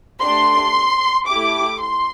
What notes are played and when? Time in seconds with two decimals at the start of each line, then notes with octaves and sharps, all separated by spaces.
0.21 A3 D4 G4 C6
1.27 A3 E4 G4 D6
1.80 C6